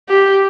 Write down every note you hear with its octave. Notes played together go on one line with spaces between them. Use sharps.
G4